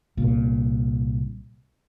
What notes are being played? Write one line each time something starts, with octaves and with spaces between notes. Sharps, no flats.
C2 A#2